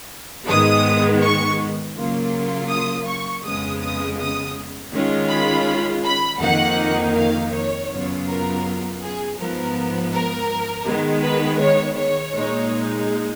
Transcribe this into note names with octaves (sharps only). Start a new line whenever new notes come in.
G#2 D#3 G#3 B3 D#6
C#6
C#3 F#3 A#3 F4
D#6
C#6
F2 C#3 G#3 B3 D#6
D#6
D#6
D#3 G#3 C#4 F4
B5
B5
F2 D#3 A#3 D#4 F#5
F5
C#5
F#2 C#3 F#3 B3 F4
A#4
G#4
G#2 F3 B3 A#4
A#4
D#3 G#3 B3
B4
C#5
C#5
A#2 G#3 D#4